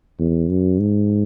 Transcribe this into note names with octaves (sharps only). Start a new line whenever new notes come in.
E2
F#2
G#2